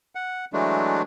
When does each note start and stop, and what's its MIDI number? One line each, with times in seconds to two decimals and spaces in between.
0.15 0.45 78
0.53 1.02 52
0.53 1.02 54
0.53 1.02 56
0.53 1.02 57
0.53 1.02 62